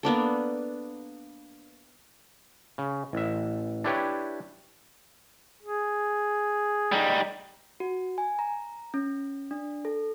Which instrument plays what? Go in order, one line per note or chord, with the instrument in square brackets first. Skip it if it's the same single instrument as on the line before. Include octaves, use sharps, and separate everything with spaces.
[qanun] A#3 B3 D4 A4
[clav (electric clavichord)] C#3
A1 E5
D4 E4 G4 B4 C#5 G5
[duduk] G#4
[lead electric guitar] G3 D#4
[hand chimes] F#4
G#5
A#5
C#4
D4
A4